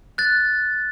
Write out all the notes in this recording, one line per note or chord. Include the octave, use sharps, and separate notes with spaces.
F#6 A6